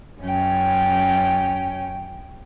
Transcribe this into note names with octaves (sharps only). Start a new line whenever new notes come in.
F#2 C#4 G5